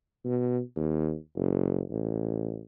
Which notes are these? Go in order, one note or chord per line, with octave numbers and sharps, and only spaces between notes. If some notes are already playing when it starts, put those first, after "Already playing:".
B2
D#2
F#1
A1